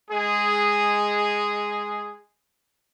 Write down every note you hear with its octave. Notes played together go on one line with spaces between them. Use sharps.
G#3 G#4